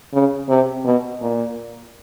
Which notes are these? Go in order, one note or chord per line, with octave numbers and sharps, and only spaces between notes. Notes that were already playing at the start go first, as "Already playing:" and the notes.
C#3
C3
B2
A#2